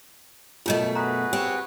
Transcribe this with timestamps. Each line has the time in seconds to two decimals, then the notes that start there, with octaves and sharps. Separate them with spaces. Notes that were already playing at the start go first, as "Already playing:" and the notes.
0.66 F#2 B2 A3 F4 C#5 D#5
0.95 F#4 G#4 B4 A#5
1.33 C4 G4 C#5